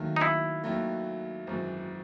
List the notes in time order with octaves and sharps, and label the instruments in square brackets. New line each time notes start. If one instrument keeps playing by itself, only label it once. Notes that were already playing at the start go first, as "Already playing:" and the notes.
Already playing: [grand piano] D#2 D#3 F#3 A3
[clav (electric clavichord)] D#4
E4
[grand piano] D#2 D#3 F#3 A3
G#1 F#2 E3